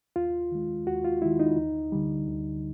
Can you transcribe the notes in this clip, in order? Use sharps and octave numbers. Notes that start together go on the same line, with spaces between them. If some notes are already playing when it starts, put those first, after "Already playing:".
D#2 F4
D#3 G#3
D#2 F#4
F4
D#3 G#3 E4
D#4
D2
D3 G3
D2